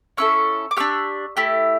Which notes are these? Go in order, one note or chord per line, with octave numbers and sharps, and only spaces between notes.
C#4 E4 A4 C#6 E6
D6
D4 G4 C#6 E6
A3 E4 G4